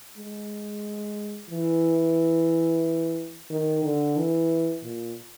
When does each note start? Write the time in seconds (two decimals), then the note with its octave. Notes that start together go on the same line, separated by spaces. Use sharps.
0.18 G#3
1.51 E3
3.51 D#3
3.84 D3
4.17 E3
4.84 A#2